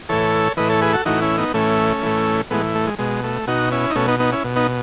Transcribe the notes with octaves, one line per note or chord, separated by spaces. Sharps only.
A2 E3 A4 C#5
A2 E3 B4 D#5
A4 C#5
G#4 B4
F#4 A4
A2 E3 D#4 F#4
C#4 E4
B3 D#4
A2 E3 A3 C#4
A2 E3
A2 E3 G#3 B3
A3
G#3
B2 G#3
A3
B2 D#4 F#4
C#4 E4
D#4
B2 A3 C#4
B3 D#4
B3 D#4
C#4 E4
B2
B3 D#4